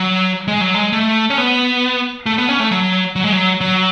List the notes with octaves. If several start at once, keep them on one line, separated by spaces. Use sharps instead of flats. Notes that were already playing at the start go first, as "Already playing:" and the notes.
Already playing: F#3
G#3
F#3
G#3
A3
C#4
B3
A3
B3
C#4
A3
F#3
F#3
G#3
F#3
F#3